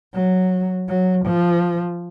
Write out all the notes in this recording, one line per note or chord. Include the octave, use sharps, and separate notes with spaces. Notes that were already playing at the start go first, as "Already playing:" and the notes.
F#3
F#3
F3